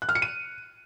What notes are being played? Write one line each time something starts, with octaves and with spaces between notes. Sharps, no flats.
F#6
F6
C#7
D#7